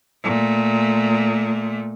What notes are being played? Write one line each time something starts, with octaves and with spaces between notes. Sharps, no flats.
A#2 A3